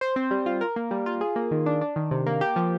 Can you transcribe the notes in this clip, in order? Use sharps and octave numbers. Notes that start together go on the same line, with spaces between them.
C5
C4
G3
F4
A#4
A#3
G3
F4
G#4
A#3
D#3
D4
D4
D#3
C3
A#3
G4
F3